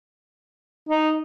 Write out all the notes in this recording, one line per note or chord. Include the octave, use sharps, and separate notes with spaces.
D#4